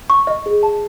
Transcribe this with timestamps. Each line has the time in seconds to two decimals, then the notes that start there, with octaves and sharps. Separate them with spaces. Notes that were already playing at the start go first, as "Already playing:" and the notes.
0.10 C#6
0.27 D#5
0.46 G#4
0.63 A5